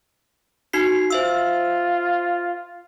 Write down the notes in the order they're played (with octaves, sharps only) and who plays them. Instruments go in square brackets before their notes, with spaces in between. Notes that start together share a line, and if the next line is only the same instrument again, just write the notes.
[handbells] D#4 F#4 C7
[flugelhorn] F4 [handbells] C5 E5 E6